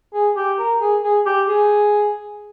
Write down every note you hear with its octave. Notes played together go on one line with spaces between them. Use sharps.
G#4
G4
A#4
G#4
G#4
G4
G#4